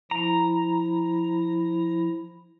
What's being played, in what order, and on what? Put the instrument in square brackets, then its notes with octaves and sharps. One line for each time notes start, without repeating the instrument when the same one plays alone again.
[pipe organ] F3 E4 [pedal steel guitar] A#5